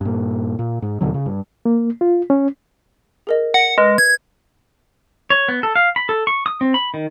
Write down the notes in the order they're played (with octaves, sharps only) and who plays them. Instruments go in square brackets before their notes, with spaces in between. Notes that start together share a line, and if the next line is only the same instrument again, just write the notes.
[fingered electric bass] G2 A#2
A#2
G#2
D#2 B2 D3 F#3
C#3
G2
[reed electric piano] A#3
F4
C#4
[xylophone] G#4 A#4 D#5
[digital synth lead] F#5 [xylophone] A#6 D7
[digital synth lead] G#3 [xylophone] B4 D#5 F6
[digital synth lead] G#6
[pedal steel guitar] C#5
B3
A4
F5
B5
A4
C#6
D#6
C4
B5
D#3